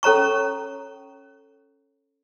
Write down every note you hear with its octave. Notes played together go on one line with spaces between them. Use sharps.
C#4 A4 C#5 A#5 C#6